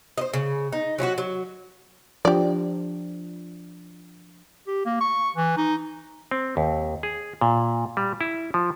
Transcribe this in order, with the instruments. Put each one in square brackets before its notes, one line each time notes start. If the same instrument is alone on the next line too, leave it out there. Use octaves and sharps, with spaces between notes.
[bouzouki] C5 D#5
C#3
D#4
F#3 C#4 F4 F#4
F#3
[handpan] F3 D4 [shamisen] G4 D5
[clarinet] G4
A#3
C#6
E3
D#4
[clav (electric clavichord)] C4
D#2
G#4
A#2
G3
E4
F3